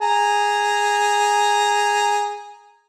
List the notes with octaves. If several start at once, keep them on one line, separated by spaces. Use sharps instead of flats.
G#4 A#5